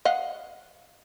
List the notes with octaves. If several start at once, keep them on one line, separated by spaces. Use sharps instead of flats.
D#5 F5 F#5